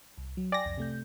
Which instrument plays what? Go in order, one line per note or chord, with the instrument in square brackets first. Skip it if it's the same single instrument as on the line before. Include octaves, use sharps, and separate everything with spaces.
[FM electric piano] C2
F#3
[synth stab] D5 A#6 [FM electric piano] G5 G#5
[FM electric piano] C2 F2
C3 A3 G6